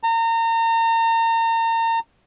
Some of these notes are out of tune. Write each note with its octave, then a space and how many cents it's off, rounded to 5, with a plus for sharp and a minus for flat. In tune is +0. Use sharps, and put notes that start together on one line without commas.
A#5 -35